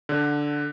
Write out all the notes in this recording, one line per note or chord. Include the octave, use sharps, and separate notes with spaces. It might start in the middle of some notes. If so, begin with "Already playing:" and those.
D3